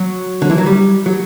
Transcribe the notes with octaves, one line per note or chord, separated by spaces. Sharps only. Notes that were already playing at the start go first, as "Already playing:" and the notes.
Already playing: F#3
D3
E3
F#3
G3
F#3